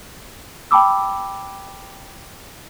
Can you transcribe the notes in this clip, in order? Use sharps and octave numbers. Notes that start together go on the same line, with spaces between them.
G5 A5 B5 D6 E6